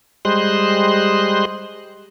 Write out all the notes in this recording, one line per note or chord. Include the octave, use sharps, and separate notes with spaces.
G3 G#3 C5 D#5 C6 F#6